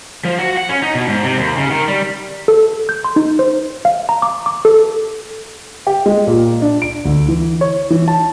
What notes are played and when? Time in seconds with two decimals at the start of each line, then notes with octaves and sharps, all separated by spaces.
0.25 F3
0.39 F#4
0.57 F#5
0.69 C#4
0.83 D#4
0.95 B2
1.08 G#2
1.23 C3
1.37 D#2
1.57 C#3
1.71 D#3
1.88 G3
2.48 A4
2.89 G6
3.04 C6
3.16 D#4
3.39 C5
3.85 F5
4.09 A#5
4.22 D6
4.46 D6
4.65 A4
5.87 G4
6.06 G#3
6.27 A#2
6.62 D4
6.82 D7
7.05 D2
7.28 E3
7.61 C#5
7.90 E3
8.08 A5